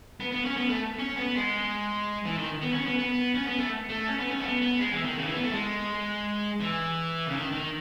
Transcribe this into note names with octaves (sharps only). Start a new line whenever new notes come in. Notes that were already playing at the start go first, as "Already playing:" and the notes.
B3
B3
C#4
B3
A3
C#4
B3
G#3
E3
D#3
B3
C#4
B3
B3
C#4
B3
A3
A3
C#4
B3
C#4
A3
B3
B3
G#3
E3
D#3
C#3
E3
B3
A3
G#3
E3
C#3
D#3
D#3